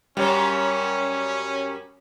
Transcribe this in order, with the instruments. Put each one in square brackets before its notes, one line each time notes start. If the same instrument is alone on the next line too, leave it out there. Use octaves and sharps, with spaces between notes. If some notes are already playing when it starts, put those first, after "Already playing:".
[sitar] F#2 [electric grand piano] G3 C#5 [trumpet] C#4